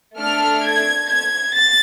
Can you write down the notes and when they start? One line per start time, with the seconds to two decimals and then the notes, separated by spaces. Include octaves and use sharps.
0.19 A3 D4 A4 F6
0.63 G#6
1.07 G#6
1.52 A6